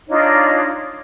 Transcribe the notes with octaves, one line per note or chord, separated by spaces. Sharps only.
D4 D#4 F4 C#5